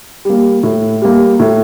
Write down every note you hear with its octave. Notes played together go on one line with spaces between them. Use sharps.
G3 A#3
A2
G3 A#3
A2